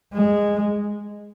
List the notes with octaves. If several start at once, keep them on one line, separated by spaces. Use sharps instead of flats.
G#3